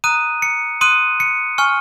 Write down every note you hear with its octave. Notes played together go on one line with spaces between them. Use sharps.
A#5 D#6 F#6 D#7
C#7
C6 D#6 F#6 D#7
C#7
G#5 C#6 F6